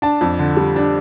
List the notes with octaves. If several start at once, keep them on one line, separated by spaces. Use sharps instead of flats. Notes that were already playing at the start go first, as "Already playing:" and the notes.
D4 A5
F2
D3
G3
D4